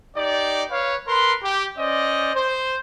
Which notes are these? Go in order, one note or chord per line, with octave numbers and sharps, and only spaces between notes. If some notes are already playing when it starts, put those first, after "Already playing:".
D#4 G4 D5
B4 C#5 F5
A#4 B4 C6
G4
C#4 C5 D5 D#5
C5